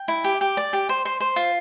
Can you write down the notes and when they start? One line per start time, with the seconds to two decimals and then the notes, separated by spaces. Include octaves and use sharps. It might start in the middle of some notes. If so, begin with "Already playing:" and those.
Already playing: G5
0.08 E4
0.24 G4
0.41 G4
0.57 D5
0.73 G4
0.89 C5
1.05 C5
1.20 C5
1.36 F4